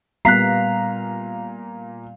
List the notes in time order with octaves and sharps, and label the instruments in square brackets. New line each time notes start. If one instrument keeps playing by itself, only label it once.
[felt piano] A#2 A#5 [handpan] G3 B3 [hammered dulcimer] F5 [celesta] F#6 B6 C7